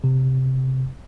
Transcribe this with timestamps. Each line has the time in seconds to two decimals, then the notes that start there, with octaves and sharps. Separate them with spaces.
0.04 C3